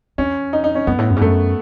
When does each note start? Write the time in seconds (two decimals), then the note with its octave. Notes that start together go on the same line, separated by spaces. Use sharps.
0.18 E2 C#4
0.53 D#4
0.64 D#4
0.75 C#4
0.87 F#2 B3
0.99 A2
1.10 F#2
1.16 G#2
1.21 F#2 A3